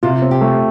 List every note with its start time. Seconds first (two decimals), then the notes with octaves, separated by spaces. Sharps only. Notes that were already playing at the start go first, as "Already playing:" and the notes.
0.03 C3 F4
0.22 C4
0.31 G4
0.41 A3